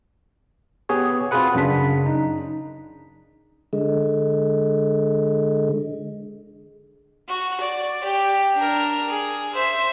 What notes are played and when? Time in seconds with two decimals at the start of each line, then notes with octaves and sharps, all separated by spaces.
0.89 B3 G4 G#4 C#5
1.31 C4 F4 F#4 G#4 B4 F#5
1.55 F#2 C#3 D4 B6
2.06 D#4
3.73 D3 G#3
7.28 F#4
7.60 D5
8.04 G4
8.54 D4 A#4
9.09 G#4
9.53 C5 E5